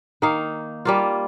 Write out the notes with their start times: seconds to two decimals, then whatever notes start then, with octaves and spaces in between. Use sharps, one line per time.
0.22 D#3 A#3 D#4 F5
0.85 G3 A#3 F4